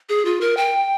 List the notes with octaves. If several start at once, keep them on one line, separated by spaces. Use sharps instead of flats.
G#4
F4
A#4
G5